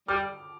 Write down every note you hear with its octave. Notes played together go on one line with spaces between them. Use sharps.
G3 D6 F6